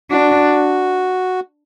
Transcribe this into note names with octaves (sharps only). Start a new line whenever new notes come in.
D4 F#4